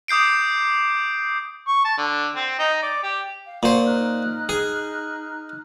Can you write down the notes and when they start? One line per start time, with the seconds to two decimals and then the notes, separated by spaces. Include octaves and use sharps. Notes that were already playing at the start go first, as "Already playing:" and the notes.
0.08 D6 D#6 G6 C7 D7
1.67 C#6
1.84 A5
1.98 D3
2.35 C4
2.59 D#4
2.82 D5
3.03 G4
3.44 F5
3.63 A#2 C5 F#5 C#6
3.86 D#4 F6 F#6
4.49 G#4